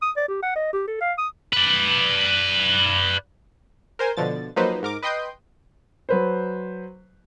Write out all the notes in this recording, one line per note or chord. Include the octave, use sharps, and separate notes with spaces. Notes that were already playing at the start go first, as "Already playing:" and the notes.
D#6
D5
G4
F#5
D#5
G4
A4
F5
D#6
B4 D5
A#4 C5 G#5 C6
B2 D3 F3 A6
F3 F#3 A#3 D#4 B4 C5
G#2 A#4 D6
B4 D#5 G5 C6 D#6 G6
F#3 B4 C5